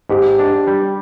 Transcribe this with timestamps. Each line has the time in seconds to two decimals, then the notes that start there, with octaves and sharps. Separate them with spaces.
0.10 G#2 G4
0.39 D4
0.67 G3